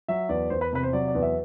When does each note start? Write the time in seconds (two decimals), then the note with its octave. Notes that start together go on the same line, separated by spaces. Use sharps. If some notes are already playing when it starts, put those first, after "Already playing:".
0.08 F#3 E5
0.29 E2 D5
0.50 E2 C5
0.61 B4
0.73 C3 B4
0.83 C5
0.93 F#3 D5
1.08 D5
1.15 E2
1.22 E5